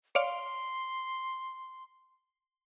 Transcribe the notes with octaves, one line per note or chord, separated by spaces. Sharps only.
C#5 D5 F5 C6